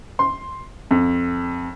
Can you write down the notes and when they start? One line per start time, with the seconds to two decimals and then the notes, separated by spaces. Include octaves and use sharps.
0.19 C6
0.91 F2